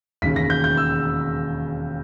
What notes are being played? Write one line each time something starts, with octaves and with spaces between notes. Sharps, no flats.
E1 D#2 C#3 B6
A#6
G6
G6
E6